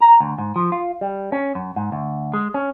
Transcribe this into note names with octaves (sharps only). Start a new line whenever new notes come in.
A#5
D2
G#2
F3
F4
G3
C#4
F#2
G#2
D2
G#3
C#4